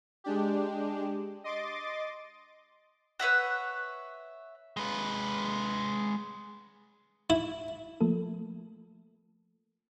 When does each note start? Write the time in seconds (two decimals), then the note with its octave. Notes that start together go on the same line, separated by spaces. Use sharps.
0.24 G#3 D4 G4
1.44 D#5 C6 D6 A6
3.20 B4 C#5 E5 F#5
4.77 G#3 B4
7.30 E4
8.01 F3 A3 A#3 A4